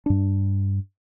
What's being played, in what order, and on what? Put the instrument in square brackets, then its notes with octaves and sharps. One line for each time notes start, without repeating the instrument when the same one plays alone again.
[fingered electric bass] G2 D4